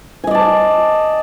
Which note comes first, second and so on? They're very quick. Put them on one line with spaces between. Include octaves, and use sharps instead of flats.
G#5 D#5 D5 A5